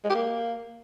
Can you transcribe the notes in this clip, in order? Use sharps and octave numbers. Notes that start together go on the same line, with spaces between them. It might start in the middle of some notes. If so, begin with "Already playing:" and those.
G#3
G4
A#3